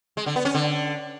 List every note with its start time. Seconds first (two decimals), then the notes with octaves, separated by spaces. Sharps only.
0.17 G#3
0.26 D3
0.36 B3
0.45 C#4
0.55 D3